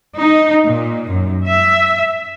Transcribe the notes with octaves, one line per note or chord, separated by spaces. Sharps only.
D#4
A#2
F#2
E5